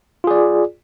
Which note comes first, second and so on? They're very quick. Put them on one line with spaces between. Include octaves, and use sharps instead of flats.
F4 G#4 D5